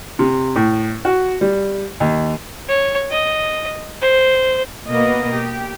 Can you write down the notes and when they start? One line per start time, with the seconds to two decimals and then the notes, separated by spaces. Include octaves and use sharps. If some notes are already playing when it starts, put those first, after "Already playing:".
0.19 C3
0.56 A2
1.05 F#4
1.41 G3
2.00 D#2
2.68 C#5
3.11 D#5
4.02 C5
4.89 B2 A#3 B3 D#5
5.33 G4